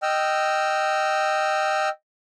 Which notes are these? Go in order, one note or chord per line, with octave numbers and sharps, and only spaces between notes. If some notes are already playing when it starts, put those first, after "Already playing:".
D#5 G5 E6 F6